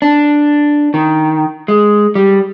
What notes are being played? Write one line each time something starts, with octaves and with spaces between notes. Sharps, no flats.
D4
D#3
G#3
G3